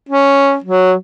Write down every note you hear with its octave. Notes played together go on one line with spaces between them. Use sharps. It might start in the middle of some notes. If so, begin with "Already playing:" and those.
C#4
F#3